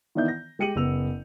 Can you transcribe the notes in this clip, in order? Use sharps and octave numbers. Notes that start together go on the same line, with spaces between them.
D#3 E3 B3 D5 E5 G6
A#6
G#3 G4 C#7 D#7 F#7
F#1 B3 E6 F7